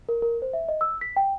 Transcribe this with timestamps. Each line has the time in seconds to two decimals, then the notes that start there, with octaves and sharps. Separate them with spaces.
0.09 A#4
0.22 A#4
0.42 C5
0.53 E5
0.68 D#5
0.81 E6
1.01 B6
1.16 G5